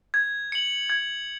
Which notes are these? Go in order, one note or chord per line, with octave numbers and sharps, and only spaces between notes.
G#6
C#7 F#7
G#6